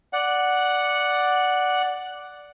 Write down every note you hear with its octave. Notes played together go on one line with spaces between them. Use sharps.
D5 F#5